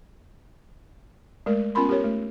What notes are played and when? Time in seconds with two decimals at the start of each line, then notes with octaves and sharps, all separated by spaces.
1.46 G#3 A3 A#4
1.75 B3 C#4 F4 A#4 B5 C6
1.89 G4 A#4 C#5
2.04 A3